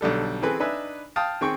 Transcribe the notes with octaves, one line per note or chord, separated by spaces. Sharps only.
B1 D3 G3 A4
E3 C4 G#4 A4 B4
D4 D#4 B4 E5 G#5
F5 G5 A5 D#6
D#3 C4 G#4 G5 C#6